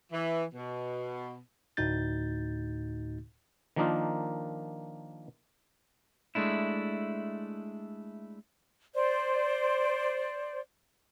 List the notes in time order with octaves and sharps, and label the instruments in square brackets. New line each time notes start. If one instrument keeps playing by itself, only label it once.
[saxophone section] E3
B2
[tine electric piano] D2 A2 D#4 F#4 G6 A6
[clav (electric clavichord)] D#3 F3 A#3 D4 D#4 F4
[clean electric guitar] G#3 A3 D4 E4
[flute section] C5 D5